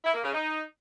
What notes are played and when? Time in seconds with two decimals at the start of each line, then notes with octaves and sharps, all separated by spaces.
0.05 E4
0.14 A#3
0.24 C#3
0.33 D#4